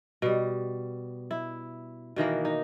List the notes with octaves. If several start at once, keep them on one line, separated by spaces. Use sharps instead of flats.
B2 G3
E4
B2 D#3 E3 A#3
D#4